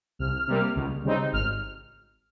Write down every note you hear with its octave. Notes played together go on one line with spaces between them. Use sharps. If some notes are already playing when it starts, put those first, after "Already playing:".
C2 F6
C3 G3 A#3
C#2
C#3 G3 C4 D#4
G#1 F6